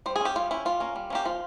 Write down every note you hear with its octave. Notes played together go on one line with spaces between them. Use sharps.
G3 C5
G#4
C#4 G4
G3 F4
C#4 E4
G3 F4
A#3 C#4
G3
A#3 C#4 G4
F3 F4